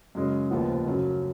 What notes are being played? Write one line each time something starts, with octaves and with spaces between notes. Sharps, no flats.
F#2 C#3 G#3 C#4
F1 D#2 C#3 F3 B3 F#5
F#2 C#3 F#3 C#4